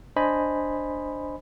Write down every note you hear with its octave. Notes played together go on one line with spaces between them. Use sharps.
D4 C5 D#5 G#5 B5